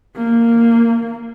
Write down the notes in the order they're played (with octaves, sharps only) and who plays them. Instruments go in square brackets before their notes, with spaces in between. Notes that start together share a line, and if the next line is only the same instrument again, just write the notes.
[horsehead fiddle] A#3